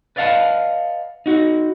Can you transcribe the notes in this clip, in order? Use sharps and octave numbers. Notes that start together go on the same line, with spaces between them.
B4 D5 D#5 F5 F#5 A5
D#4 F#4